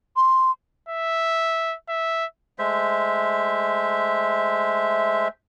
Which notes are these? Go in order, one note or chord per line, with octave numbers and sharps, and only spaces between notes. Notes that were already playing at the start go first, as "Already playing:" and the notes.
C6
E5
E5
G#3 A3 C5 E5